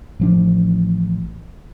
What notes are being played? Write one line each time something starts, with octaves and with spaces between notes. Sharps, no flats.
A1 F3 D4